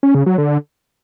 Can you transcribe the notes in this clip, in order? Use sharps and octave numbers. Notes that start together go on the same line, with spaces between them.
C#4
C#3
F#3
D3